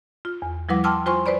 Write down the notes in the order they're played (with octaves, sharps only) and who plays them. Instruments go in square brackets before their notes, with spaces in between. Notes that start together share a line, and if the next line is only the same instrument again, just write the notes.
[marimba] F4
E2
F3 G3 E4 B4 F#5 D6
G5 A5 C6 D6 E6 F6
F4 C5 G#5 C6 C#6
B4 C5 D5 B5